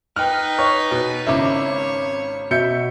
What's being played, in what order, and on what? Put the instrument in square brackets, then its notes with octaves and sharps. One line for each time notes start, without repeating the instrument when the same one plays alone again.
[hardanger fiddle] D#4 B4 [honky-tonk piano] G5 F#6 [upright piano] F6
[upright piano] C#5
B2
[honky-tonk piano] G#1 C#3 D6 [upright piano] E4 [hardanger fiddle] C#5
[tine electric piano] B2 [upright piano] E5 G6 C#7